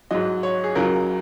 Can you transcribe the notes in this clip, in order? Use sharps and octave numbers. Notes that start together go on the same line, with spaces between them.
G#2 F#3 D#5
C#5
G#4
C#2 C#3 F#3 A#4